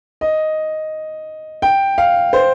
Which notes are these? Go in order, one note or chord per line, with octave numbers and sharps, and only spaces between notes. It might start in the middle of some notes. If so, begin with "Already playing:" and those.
D#5
G5
F5
C5